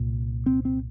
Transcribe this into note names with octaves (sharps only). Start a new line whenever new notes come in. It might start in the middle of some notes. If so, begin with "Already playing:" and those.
Already playing: C2 A#2
C4
C4